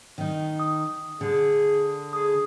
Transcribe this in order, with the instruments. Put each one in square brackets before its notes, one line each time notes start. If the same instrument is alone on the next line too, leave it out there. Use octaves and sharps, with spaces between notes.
[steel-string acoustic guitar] D#3 D#4
[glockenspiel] D#6
[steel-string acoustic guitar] D3 [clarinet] G#4
[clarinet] G#4 [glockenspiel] D#6